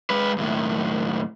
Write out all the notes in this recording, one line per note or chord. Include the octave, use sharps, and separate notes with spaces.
G#3 B4
D#2 A2